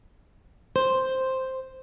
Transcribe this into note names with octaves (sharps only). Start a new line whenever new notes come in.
C5